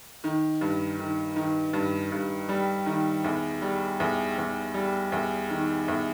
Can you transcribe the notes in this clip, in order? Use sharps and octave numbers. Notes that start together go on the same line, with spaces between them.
D#3
G2
D#3
D#3
G2
G2
G3
D#3
E2
G3
E2
E2
G3
E2
D#3
E2